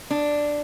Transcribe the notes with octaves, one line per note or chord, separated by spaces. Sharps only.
D4